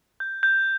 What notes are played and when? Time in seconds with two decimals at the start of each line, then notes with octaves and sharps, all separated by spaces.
0.20 G6
0.43 G6